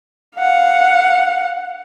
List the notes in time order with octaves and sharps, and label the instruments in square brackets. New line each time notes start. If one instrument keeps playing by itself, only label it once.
[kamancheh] F5 F#5